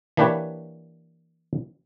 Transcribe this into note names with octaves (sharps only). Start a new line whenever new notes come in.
E3 A#3 D4 G4 B4 C#5